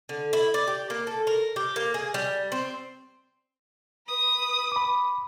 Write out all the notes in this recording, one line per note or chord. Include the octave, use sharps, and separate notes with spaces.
D3
E4
D5
G4
A#3
A4
A#4
G4
A#3
G#4
G3
C4
B4 D#6
B5 D6